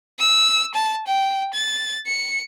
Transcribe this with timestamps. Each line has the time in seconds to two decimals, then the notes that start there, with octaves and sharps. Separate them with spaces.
0.19 E6
0.74 A5
1.07 G5
1.53 A6
2.07 C#7